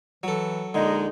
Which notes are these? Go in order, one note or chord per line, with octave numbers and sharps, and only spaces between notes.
E3 F#3 A4
A#1 D3 G#3 D#4